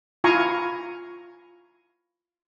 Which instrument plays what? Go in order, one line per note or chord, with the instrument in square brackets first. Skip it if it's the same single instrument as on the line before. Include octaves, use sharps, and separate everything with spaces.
[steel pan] E4 F4 F5 G#5 A#5 C#6